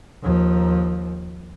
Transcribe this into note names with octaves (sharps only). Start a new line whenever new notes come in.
D#2 F3